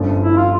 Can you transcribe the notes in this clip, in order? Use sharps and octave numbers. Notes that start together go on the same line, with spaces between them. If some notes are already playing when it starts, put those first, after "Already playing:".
Already playing: G1 G2 F3 C#4
E4
F4